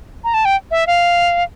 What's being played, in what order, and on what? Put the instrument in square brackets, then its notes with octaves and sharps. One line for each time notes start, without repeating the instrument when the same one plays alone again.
[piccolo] A#5
A5
G5
E5
F5